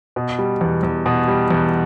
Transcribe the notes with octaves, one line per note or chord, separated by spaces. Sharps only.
B2
G3
E2
E2
B2
G3
E2